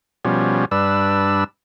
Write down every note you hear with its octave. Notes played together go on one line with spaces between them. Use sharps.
B2 F3 G3 C#4
G2 D4 B4 E6